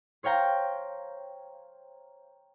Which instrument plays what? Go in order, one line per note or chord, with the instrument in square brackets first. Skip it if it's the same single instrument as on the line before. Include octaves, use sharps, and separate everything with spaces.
[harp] C5 C#5 F5 G5 A#5